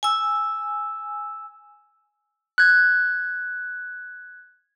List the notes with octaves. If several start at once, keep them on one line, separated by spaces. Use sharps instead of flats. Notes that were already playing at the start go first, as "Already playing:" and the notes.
G#5 E6
F#6 G#6